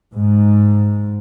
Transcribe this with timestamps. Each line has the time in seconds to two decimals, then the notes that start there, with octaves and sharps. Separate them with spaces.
0.13 G#2